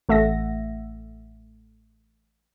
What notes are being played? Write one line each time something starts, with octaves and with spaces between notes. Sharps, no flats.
A1 A3 E5 F#5 A#6